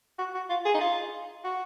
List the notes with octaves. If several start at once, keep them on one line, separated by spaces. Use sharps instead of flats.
F#4
F#4
F4
G#4
D#4
F4
F#4